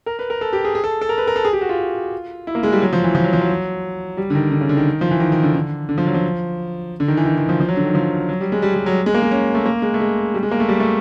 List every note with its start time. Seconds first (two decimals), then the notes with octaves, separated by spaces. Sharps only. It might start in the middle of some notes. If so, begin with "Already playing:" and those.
0.06 A#4
0.19 B4
0.30 A#4
0.41 A4
0.53 G4
0.64 G#4
0.75 G#4
0.84 A4
1.01 A4
1.09 A#4
1.18 B4
1.27 A#4
1.36 A4
1.45 G#4
1.53 G4
1.61 F#4
1.69 F4
2.47 E4
2.55 A#3
2.63 G#3
2.72 G3
2.82 F#3
2.93 F3
3.04 E3
3.15 F3
3.24 F#3
3.33 F3
3.41 F#3
4.17 G3
4.30 D3
4.35 D#3
4.51 D3
4.61 C#3
4.69 D3
4.77 D#3
5.01 F3
5.11 E3
5.20 D#3
5.32 D#3
5.43 D3
5.55 D3
5.89 D3
5.98 F3
6.07 F#3
6.14 F3
7.00 D3
7.08 D#3
7.17 E3
7.25 D#3
7.37 D#3
7.49 F3
7.60 F3
7.69 F#3
7.77 D3
7.85 D#3
7.94 F3
8.29 F#3
8.41 G3
8.52 G#3
8.62 G3
8.74 G3
8.86 F#3
9.06 G#3
9.15 A#3
9.22 G#3
9.31 C#4
9.55 A3
9.66 A#3
9.82 G#3
9.94 A3
10.00 G#3
10.34 G3
10.43 G#3
10.51 A#3
10.60 A3
10.68 G3
10.80 A3